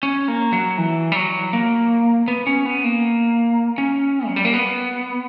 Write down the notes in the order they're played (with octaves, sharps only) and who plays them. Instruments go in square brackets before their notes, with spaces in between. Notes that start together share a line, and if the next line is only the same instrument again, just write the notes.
[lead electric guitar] C#4
A#3
F#3
E3
G3
F#3
A#3
B3
C#4
B3
A#3
C#4
F#3
G3
A#3
B3